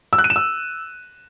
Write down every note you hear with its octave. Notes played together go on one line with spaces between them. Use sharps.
E6
F#6
D#7
E7
E6